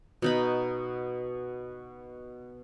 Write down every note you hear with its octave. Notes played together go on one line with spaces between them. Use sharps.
B2 D#4 B5